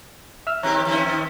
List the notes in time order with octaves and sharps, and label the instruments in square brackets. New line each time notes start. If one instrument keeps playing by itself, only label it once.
[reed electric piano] E5 E6 F6
[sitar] D#3 C4 G4 [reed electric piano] C#5 A#5 F#6
[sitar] D#3 C4 C#4